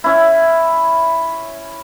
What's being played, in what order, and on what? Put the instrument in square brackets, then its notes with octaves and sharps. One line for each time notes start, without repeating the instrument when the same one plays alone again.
[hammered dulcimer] C#4 E4